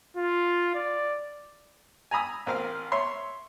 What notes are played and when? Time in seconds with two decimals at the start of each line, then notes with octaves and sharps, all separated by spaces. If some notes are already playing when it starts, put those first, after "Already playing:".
0.17 F4
0.75 D5
2.11 G#5 A#5 B5 D#6 E6
2.46 A1 C4 A#4 F5 F6
2.92 C#5 E5 C6